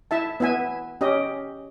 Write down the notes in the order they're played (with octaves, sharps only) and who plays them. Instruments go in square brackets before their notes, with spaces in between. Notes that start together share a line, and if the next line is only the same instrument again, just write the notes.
[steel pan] E4 E5 A5
B3 E4 E5 G#5
C#4 G4 D#5